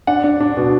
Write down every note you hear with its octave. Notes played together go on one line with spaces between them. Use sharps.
D4 F#5
D4
D4
B2